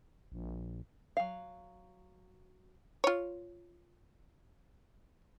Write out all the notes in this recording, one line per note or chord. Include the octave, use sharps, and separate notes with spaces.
A#1
F#3 F5
F4 C#5